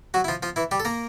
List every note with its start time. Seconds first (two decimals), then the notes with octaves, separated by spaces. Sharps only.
0.14 F#3 F#4
0.24 E4
0.28 F3 F4
0.43 F3 F4
0.56 E3 E4
0.71 G3 G4
0.80 A4
0.85 A#3 A#4